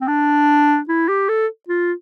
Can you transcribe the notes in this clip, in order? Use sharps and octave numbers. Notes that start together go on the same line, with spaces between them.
C4
D4
E4
G4
A4
F4